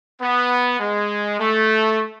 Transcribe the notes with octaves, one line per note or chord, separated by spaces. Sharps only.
B3
G#3
A3